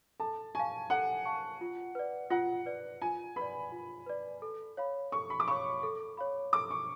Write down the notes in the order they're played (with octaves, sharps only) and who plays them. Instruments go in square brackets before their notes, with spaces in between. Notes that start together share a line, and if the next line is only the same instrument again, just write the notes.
[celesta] A4 [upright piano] A5
[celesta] F5 A5 C#6 [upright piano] G#5
[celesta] A4 [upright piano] F#5
[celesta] F5 A5 C#6
F4
B4 D5
[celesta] F4 [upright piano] F#5
[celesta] B4 D5
[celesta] F4 [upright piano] G#5
[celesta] B4 D5 [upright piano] B5
[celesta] F4
B4 D5
A4
C#5 F5 B5
[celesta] A4 [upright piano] C#6
[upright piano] B5
D6
[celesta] C#5 F5 B5 [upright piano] C#6
[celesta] A4
C#5 F5 B5
[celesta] A4 [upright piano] D6
[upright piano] C#6